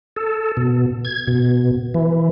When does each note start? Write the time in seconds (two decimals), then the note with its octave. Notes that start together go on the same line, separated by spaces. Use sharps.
0.16 A4
0.57 B2
1.05 G#6
1.27 B2
1.94 E3